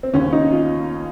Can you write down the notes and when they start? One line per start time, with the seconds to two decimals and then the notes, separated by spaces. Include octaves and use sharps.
0.03 C4
0.13 D#2 C#3 C#4
0.33 D#4
0.51 F4